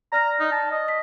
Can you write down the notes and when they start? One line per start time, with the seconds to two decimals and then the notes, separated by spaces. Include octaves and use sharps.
0.12 D5 A#5 F6 A#6
0.40 D#4
0.52 A5
0.72 D#5
0.88 B6